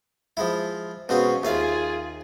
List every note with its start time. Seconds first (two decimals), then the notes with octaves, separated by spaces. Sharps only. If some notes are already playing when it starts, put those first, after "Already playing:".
0.37 F3 G#3 E4
1.09 B2 G#3 C4 C#4 F5
1.43 D#2 F4 G#4 E5 F5